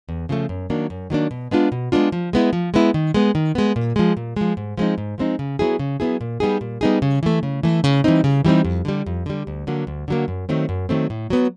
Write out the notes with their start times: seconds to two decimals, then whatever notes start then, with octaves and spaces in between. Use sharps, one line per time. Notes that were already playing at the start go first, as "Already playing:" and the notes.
0.09 E2
0.29 C#3 F3 A3
0.49 F#2
0.70 D#3 F#3 A#3 D4
0.90 F#2
1.10 D#3 F#3 A#3 D4
1.31 B2
1.51 G#3 B3 D4 F4
1.72 B2
1.92 G#3 B3 D4 F4
2.12 F3
2.33 G#3 B3 E4
2.53 F3
2.74 G#3 B3 E4
2.94 D#3
3.14 G#3 B3
3.35 D#3
3.55 G#3 B3
3.76 A#2
3.96 F3 G#3
4.17 A#2
4.36 F3 G#3
4.57 G#2
4.77 F3 G#3 C4 D#4
4.98 G#2
5.18 F3 G#3 C4 D#4
5.39 C#3
5.59 F#3 B3 E4 G#4
5.79 C#3
6.00 F#3 B3 E4 G#4
6.21 A#2
6.40 G3 B3 D#4 G#4
6.61 A#2
6.81 G3 B3 D#4 G#4
7.02 C#3
7.23 E3 A3
7.43 C#3
7.63 E3 A3
7.84 C#3
8.04 E3 G3 C4 D#4
8.24 C#3
8.45 E3 G3 C4 D#4
8.65 F2
8.85 D3 G3
9.06 F2
9.26 D3 G3
9.47 D2
9.67 D3 F#3 A#3
9.87 D2
10.08 D3 F#3 A#3
10.28 F#2
10.49 D#3 F#3 A3 C4
10.69 F#2
10.89 D#3 F#3 A3 C4
11.10 A2
11.30 F#3 B3